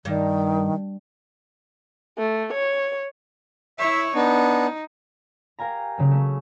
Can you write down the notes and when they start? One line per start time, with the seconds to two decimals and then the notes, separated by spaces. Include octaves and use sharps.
0.05 G2 D#3
2.18 A3
2.53 C#5
3.79 E4 C#5 E5
4.15 B3 D4 D#4
5.59 G4 A#4 F5 G#5 A#5
5.98 C#3 F#3 A#3
6.11 A3 C#4